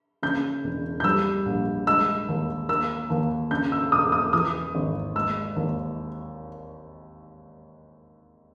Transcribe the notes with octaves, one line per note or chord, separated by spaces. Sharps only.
C#3 G6
E1
G6
G3 E6
A#1
G#3 E6
D#2
A#3 E6
D#2
C#3 G6
E6
E1 D#6
D#6
E3 D#6
G#1
G#3 E6
D#2